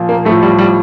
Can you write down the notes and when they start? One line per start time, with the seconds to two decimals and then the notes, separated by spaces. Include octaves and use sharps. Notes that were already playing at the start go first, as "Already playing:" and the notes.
Already playing: A#2 F3
0.09 A#3
0.25 A2 A3
0.29 F3
0.43 G3
0.58 G3